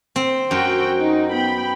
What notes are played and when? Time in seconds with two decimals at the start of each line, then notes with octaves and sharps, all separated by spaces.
0.16 C4
0.51 F#2 C4 F#4 G5
0.97 D#4
1.31 B3 G5 B5